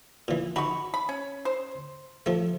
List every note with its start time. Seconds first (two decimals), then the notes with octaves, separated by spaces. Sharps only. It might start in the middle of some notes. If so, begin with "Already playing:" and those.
0.28 A#2 E3
0.56 D#4 F#4 B5 C#6
0.94 B5
1.09 C#4
1.45 C5
2.26 F3 A3